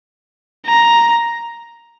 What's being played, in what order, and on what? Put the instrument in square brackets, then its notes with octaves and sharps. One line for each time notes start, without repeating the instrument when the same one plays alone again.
[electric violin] A#5